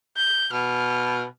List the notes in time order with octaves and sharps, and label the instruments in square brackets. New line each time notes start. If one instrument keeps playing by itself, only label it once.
[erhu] G6
[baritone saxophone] B2 [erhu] F6